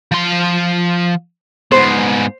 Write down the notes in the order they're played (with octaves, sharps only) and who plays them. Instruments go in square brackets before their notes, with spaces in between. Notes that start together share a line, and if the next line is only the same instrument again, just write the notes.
[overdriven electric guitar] F3 C6
[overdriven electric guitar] G#2 B3 [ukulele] C5